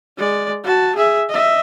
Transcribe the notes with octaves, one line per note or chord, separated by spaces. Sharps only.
G#3 D5
F#4 A5
G#4 E5
D#5 E5